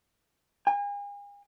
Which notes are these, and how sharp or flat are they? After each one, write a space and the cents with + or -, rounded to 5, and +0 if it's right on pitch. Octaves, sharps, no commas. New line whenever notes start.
G#5 -40